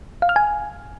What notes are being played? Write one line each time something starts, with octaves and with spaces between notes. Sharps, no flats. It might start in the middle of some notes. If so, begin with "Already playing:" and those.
F5
F6
G#5